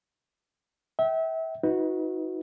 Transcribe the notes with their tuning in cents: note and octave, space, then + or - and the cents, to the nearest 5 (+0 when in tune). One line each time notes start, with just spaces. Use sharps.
E5 -30 G5 -35
D#4 +35 F#4 -15 B4 +0